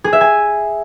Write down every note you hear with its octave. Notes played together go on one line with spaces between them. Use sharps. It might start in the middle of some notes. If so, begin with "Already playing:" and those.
G#4
E5
G#5